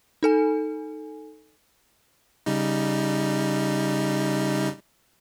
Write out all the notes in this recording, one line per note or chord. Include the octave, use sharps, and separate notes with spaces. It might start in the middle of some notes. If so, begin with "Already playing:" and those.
D#4 A4 G#5
C#3 G3 D#4